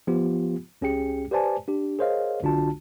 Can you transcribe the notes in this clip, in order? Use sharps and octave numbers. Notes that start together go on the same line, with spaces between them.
F3 B3 F4 G4
C#2 C#4 G4 G#4 G5 C#7
G4 B4 C5 D5 G#5 A5
D4 G4
G#4 A#4 C5 C#5 D#5 F5
B1 D3 D4 F4 F#4 A5